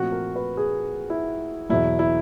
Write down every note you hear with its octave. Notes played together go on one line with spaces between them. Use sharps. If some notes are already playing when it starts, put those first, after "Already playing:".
Already playing: A#2 F3 A3 C4 F#4
A#4
B4
G#4
E4
E2 B2 F#3 E4
E4